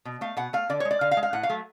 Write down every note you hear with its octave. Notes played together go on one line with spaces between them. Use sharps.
B2
A3 F5
B2 F#5
A3 F5
D3 D5
G#3 C#5
D5
D3 F5
F5
G#3
F5
A2 F#5
F5
F#3 A3